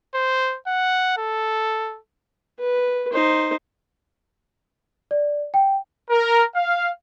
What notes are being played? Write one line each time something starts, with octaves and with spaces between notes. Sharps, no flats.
C5
F#5
A4
B4
D#4 C5
D5
G5
A#4
F5